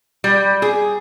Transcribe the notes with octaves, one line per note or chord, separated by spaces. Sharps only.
G3
G#4